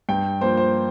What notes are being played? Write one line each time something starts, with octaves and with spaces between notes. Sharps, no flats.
G2 G5
F3 A#3 C5
C5